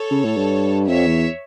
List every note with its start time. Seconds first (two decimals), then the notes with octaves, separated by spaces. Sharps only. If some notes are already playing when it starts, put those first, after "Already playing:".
Already playing: A4 C#5
0.11 C#3
0.24 A2
0.37 G2
0.88 F2 C#5 E5
1.07 E2